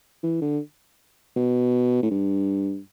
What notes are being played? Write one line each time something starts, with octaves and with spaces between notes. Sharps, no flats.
E3
D3
B2
A2
G2